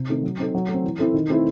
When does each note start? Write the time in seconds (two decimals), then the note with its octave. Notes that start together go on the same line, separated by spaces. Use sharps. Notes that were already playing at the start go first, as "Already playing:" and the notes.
Already playing: C3
0.09 D#3 A3 C4
0.23 F#3
0.39 C4 D#4 A4
0.55 F#3
0.68 A3
0.74 C4
0.84 E3
0.99 C4 E4 A4
1.14 D#3
1.30 A3 C4 E4 A4